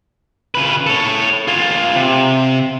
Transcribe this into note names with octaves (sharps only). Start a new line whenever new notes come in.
C#3 B4
A4 C#5
F4 G#4
C3